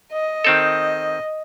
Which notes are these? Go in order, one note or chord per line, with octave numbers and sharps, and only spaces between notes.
D#5
D#3 C4 A4